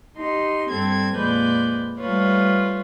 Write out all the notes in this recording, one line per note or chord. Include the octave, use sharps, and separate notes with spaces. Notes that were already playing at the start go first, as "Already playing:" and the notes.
D#4 G4 C6
G2 C4 A4 G#6
F2 A#2 G#3 B4 D5 G6
G3 A3 F4 B4 C#5